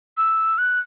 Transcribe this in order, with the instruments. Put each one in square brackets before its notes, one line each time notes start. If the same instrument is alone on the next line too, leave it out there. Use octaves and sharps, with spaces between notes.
[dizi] E6
F#6